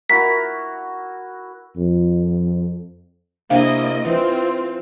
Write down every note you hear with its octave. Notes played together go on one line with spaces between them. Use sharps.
E4 F#4 A#4 B6
F2
C3 A#3 D4 E4 D#5 F5 G#5
E3 C4 F4